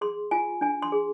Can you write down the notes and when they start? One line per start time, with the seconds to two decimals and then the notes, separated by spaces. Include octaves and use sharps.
0.01 G#4 C6
0.31 F4 G#5
0.61 D4 G#5
0.82 C6
0.92 G#4